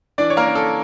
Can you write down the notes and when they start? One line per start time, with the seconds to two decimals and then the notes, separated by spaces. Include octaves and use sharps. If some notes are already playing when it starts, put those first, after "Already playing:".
0.18 E3 D4 D5
0.30 C#5
0.37 A#3 A#4
0.46 C#4
0.55 A4